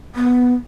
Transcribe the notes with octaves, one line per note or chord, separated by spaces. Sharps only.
B3